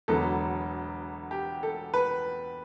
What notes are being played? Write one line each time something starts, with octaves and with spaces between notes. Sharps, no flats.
E1 E2 D3 F#3 B3 A4
G4
A4
B4